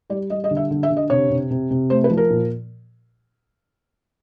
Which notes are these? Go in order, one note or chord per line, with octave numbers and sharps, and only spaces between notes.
G3 D5
G3 D#5
D#5
D3
E5
D3
E5
D3
D#5
C3 C#5
C3
C3
C3
A3 C5
B4
F3
A#4
A#2